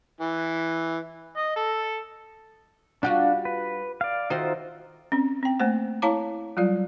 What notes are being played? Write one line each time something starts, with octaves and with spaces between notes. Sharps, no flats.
E3
D#5
A4
G3 D4 F4 F#4 F#5 F#6
B4
D5 F5
D#3 D#4 F4 F#4 C5 E5
C4 C#4
C4 G5
A3 A#3 C5 F#5
E4 C#5 F5 A5 A#5 D6
F#3 G3 F4 D5